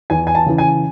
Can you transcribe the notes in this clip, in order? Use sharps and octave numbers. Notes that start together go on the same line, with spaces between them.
E2 G#5
G#5
A5
C#3 E3
G#5